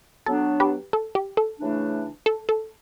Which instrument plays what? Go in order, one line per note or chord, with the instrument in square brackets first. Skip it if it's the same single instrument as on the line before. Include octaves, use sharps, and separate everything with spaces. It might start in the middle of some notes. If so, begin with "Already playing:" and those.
[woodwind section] F#3 B3 D4 [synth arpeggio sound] A4
[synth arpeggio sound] G4 B4
A4
G4
A4
[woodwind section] C#3 E3 A3 D4
[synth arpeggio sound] A4
A4